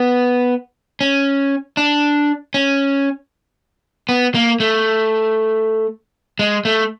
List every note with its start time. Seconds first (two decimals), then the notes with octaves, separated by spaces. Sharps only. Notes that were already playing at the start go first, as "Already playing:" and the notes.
Already playing: B3
1.01 C#4
1.77 D4
2.54 C#4
4.09 B3
4.35 A#3
4.60 A3
6.39 G#3
6.65 A3